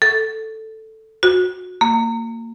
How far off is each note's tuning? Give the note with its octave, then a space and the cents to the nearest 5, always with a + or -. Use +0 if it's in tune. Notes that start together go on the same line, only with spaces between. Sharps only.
A4 +5
F#4 -20
A#3 -25